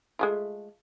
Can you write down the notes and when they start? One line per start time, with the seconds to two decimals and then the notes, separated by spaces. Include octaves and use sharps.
0.19 G#3 A3 F4